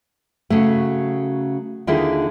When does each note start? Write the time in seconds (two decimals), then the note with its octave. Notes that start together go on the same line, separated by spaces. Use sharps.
0.50 C#3 F#3 A3
1.87 D#2 D3 D#3 E4 F4 G#4